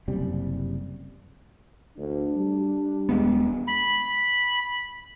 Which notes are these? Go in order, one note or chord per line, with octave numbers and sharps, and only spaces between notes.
F#1 C3 G3
D2 D4
G3
D#1 G#3 B3
B5